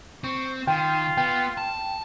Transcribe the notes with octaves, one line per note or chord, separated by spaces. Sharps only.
C4 C#6
D#3 F4 G5
B3 G5
A5